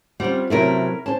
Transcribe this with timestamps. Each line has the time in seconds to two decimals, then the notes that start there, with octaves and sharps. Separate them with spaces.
0.20 G3 C4 C#4 F4 F#5
0.50 C3 F#3 A3 C#4 E4 A#4
1.06 C#4 C5 A5